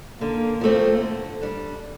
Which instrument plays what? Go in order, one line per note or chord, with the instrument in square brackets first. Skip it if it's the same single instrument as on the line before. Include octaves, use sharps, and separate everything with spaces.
[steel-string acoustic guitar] D3 [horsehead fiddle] A#3
[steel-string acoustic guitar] F3 A3 C4
D3
G3 D4